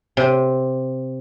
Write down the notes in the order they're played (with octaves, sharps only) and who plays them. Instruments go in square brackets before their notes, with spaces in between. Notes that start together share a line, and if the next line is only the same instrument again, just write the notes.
[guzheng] C3